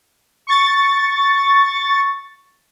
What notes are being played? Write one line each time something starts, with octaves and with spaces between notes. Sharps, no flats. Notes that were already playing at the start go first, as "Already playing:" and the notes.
C#6 A6